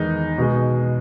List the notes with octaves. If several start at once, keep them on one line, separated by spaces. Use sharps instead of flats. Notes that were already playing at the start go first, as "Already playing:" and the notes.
Already playing: E2 D#3 G#3 D#4
B2 G#3